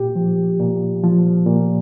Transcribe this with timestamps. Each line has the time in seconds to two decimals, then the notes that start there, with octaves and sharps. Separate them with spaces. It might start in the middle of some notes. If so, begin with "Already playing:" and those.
Already playing: A#2 G4
0.15 F3
0.59 A#2
1.03 F3
1.46 A#2